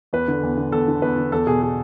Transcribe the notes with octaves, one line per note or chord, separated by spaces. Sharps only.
E2 B4
D3
E2
D3
E2 A4
D3
E2 B4
D3
E2 A4
B2 G#4
G#4